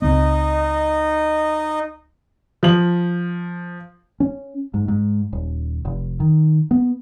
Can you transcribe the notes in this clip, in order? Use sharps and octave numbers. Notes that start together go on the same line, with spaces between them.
C#2 C4 D#4 D#5
F3 F#7
C#4
G#2
G#2
D#1
F1
D#3
B3